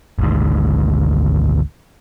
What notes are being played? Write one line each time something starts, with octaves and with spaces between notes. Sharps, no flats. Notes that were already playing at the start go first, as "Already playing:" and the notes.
G#1 D2 G#2